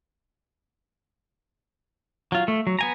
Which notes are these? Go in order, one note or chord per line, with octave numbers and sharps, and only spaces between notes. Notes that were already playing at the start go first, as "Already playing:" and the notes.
F#3 F4
A3
F#3
B3 G#5 A#5